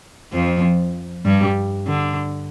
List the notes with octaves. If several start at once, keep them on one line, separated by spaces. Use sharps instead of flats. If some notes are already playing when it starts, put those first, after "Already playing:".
F2 F3
G2 G3
D3